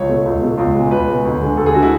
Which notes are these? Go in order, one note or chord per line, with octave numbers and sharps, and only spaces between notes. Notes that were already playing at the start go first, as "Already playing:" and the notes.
Already playing: C#2 C#5
B2 A3
C#2
B2 A3
C#2
B2 G#3
C#2 B4
B2 G#3
D2
D3 G#3
D2 A4
G#4
D3 G#3 F#4
E4